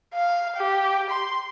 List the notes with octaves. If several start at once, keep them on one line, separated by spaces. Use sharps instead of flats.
F5
G4
C6